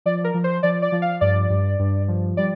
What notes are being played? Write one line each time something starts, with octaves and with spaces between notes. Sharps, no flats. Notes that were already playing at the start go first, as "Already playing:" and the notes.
F3 D5
A#4
F3
C5
F3 D5
D5
F3
F5
G2 D5
G2
G2
F3
G3 D5